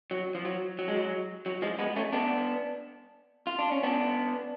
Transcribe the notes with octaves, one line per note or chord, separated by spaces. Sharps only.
F#3
F3
F#3
F#3
G#3
F#3
F#3
F3 G#3
G#3 B3
A3 C#4
B3 D4
F4
D4
C#4
B3 D4